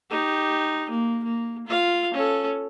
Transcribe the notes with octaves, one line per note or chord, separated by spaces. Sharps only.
D#4 G4
A#3
A#3
F4 F5
C#4 A4